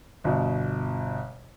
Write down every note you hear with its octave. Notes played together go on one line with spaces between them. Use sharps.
G1 B2